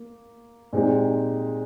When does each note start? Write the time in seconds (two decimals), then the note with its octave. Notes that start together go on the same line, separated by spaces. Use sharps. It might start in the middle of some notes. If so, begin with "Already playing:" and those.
Already playing: A#3
0.73 A#2 G#3 C4 D#4 G4